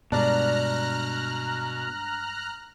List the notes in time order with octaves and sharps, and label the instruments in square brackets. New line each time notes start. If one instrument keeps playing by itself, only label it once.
[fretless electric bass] G2 G#3 [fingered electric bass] B2 [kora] D4 [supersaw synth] A#5 F6 F#6